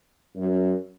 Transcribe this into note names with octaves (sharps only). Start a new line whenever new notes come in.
F#2